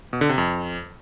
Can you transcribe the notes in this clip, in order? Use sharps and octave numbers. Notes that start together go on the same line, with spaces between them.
B2
D3
C3
F2